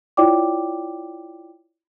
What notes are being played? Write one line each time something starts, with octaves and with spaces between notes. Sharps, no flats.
E4 F4 C#5 D5 G5 D6